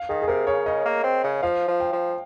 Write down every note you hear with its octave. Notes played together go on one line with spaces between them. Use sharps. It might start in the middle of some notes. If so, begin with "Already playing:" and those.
Already playing: F5
D#3 G#4
G#4
C3 A#4
C#3 C#5
C#3 D#5
A#3
C4
C#3
F3 F5
F3
G5
F3